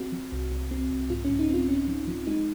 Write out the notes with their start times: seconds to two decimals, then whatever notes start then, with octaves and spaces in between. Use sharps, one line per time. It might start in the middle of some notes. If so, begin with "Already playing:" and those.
Already playing: C4 F#4
0.12 F3
0.32 C2
0.52 C2
0.71 C4
0.90 C2
1.10 G#2 F4
1.25 C#4
1.30 G#2
1.39 D#4
1.49 C4 F4
1.68 G#2 C#4
1.88 F3
2.08 F3
2.27 G#3 D#4